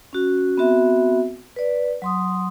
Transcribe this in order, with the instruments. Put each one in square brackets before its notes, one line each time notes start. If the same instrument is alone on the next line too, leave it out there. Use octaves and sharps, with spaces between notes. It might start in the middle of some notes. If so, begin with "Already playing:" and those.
[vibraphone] C#4 F#4
B3 C4 F#4 E5
B4 D5
F#3 C6 D#6